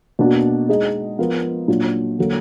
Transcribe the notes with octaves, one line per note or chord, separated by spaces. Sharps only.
B2 A#3 D4 F#4
G#3 D#4 G#4 D#5
F3 B3 F4 A#4
A#2 F#3 D4 F4
D3 F#3 A#3